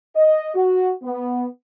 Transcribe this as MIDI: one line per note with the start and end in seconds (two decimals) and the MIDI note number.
0.15 0.49 75
0.54 0.91 66
1.03 1.45 59